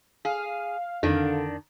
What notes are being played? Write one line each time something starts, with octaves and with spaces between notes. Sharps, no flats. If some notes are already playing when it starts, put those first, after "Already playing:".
G#4 F5
F2 D3 D#3 D4